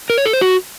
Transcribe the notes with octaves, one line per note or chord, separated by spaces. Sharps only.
A#4
C#5
A4
C5
F#4